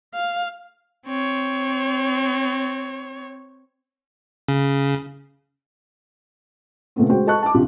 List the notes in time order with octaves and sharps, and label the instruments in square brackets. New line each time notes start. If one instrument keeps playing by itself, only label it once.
[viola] F5
[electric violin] C4 C#5
[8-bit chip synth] C#3
[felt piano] A#2 C#3 A3 B3 C4
G#3 F#4 C5 G5
A4 D#5 A5 C#6 F#6
A5 D6
A#1 C3 F4 G4